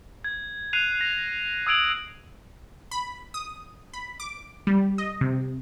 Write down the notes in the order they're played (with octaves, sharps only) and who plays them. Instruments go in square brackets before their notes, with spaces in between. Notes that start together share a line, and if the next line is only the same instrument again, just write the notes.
[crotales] G#6
F#6 C7 D#7 F7
A#6
D#6 E6 G#6 D7 F7 F#7
[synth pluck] B5
D#6
B5
D6
G3
D#5
C3